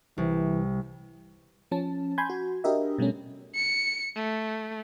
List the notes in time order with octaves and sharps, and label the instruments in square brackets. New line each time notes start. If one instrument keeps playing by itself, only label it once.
[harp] C2 [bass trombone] E3
[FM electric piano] F3 C#4 A5
G#5 B5 C6 G6 G#6
F#4
D4 F#4 G4 A#4 D#5 E5
B2 G3 A3 C#4
[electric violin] C#7
A3